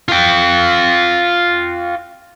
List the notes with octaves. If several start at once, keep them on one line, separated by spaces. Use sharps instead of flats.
F4 G5